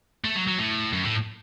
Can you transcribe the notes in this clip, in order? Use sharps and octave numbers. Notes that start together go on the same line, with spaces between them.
A3
F#3
F#3
A2
F#2
A2